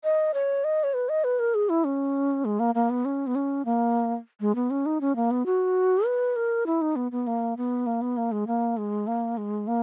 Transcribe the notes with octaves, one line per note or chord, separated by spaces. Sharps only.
D#5
C#5
D#5
C#5
B4
D#5
B4
A#4
G#4
E4
C#4
G#3
A#3
A#3
B3
C#4
B3
C#4
A#3
G#3
B3
C#4
D#4
C#4
A#3
B3
F#4
B4
A#4
E4
D#4
B3
B3
A#3
B3
A#3
B3
A#3
G#3
A#3
G#3
A#3
G#3
A#3